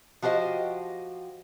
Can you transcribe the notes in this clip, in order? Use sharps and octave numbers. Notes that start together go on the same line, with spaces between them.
F3 F#4 G4 C5 D#5